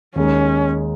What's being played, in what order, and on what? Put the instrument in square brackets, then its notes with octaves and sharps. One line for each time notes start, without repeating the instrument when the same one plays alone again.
[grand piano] D#2 D#3 G#3 D#4 [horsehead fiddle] C#4